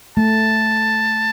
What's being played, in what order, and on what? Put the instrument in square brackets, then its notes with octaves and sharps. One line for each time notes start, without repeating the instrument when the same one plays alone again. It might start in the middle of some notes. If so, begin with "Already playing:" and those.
[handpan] A3 [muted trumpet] A5